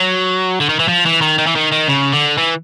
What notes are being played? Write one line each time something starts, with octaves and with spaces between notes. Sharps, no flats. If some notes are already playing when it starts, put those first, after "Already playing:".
Already playing: F#3
D3
D#3
E3
F3
E3
D#3
D#3
E3
D#3
D#3
C#3
D3
E3